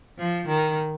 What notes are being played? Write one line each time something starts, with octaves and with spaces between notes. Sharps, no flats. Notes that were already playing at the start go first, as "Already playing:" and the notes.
F3
D#3